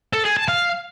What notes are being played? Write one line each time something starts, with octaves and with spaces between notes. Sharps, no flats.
A4
G#4
A5
F5